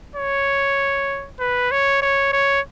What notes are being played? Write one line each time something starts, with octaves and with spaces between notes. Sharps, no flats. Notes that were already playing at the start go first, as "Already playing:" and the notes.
C#5
B4
C#5
C#5
C#5